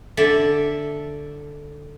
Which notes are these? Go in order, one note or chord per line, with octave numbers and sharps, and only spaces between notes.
D3 A4 D5 E5